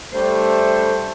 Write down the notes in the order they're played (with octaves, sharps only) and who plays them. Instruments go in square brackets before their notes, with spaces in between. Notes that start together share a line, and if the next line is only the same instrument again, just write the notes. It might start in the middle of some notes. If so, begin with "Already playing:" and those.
[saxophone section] G3 D4 C5 [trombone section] A3